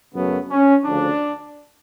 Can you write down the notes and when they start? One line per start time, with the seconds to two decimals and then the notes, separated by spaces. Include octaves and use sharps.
0.14 F#2 C#3 F#3 A3 B3
0.49 C#4
0.85 D2 C#3 F3 D4